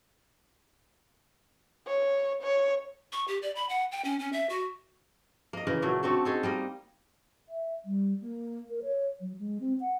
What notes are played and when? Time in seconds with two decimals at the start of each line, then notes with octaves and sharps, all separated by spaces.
1.87 C#5
2.42 C#5
3.13 C#6
3.28 G4
3.42 D5
3.55 B5
3.69 F#5
3.92 G5
4.05 C#4
4.19 C#4
4.33 E5
4.49 F#4
5.53 A#3 D#5
5.67 C#3 E3 A#3 A#4
5.82 A#2 F#3 A3 A#3
6.03 A3 C4 D4 F#4
6.25 D#4 G#4 A4
6.43 G3 A#3 D#5
7.49 E5
7.85 G3
8.21 A#3
8.70 A#4
8.82 C#5
9.21 F#3
9.39 G#3
9.60 C4
9.80 F#5